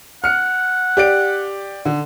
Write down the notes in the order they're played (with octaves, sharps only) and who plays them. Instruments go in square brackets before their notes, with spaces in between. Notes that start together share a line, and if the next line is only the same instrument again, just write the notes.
[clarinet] F#5 [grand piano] F6 C#7
[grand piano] G4 D5 D7
D3